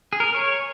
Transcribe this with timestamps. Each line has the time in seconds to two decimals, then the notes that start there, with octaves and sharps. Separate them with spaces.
0.13 G#4
0.20 A#4
0.35 C#5